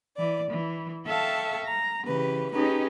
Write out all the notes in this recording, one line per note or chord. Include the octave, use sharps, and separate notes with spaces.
E3 D5
E3
A4 E5 F5 G5 A5 C#6
A#5
C#3 E3 G4 B4
C#4 D#4 G4 G#4 B4